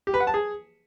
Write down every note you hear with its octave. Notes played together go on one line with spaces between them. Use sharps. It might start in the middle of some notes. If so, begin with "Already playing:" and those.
G4
B4
F#5
A5
G#4